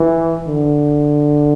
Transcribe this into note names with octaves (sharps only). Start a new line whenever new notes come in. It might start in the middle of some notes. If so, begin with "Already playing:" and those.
Already playing: E3
D3